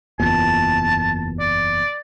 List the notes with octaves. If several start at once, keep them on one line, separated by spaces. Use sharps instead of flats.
F#1 E2 A#2 A5
D5